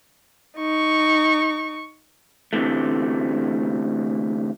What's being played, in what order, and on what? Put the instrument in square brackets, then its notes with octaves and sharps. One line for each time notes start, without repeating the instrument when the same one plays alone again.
[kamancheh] D#4 C#6
[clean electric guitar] D2 C3 E3 A3